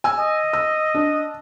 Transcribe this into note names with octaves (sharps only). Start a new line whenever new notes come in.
G#5 E6
D#5
E6
D4